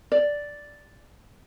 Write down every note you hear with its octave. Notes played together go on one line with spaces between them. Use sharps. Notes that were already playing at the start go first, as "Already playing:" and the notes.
D5